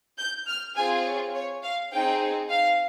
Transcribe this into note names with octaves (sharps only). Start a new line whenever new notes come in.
G6
F6
C4 F4 G#4 G#5
C#5
C#5
F5
C4 D#4 G#4 G5
F5